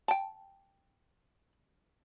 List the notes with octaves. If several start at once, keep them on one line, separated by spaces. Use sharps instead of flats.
G5 A5